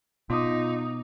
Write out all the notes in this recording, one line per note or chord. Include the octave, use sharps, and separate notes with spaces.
B2 D#4 F4 D6 D#6